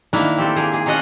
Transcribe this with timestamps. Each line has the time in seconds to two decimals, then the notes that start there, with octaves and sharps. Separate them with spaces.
0.13 D#3 A#3 D4 E4
0.38 C4 G4 A4
0.56 A#3 G4 G#4
0.73 G#4
0.86 A#3 C#4 A4 D#5 F#5